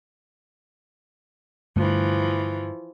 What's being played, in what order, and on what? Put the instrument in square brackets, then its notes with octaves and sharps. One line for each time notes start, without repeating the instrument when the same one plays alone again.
[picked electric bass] G2 D3 A3 [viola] E3 F3